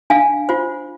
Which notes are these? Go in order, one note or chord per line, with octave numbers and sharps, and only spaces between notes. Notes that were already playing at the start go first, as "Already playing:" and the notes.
D4 F5 G#5
F4 C5